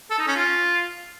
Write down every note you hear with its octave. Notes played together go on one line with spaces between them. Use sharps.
A4
D#4
C#4
F4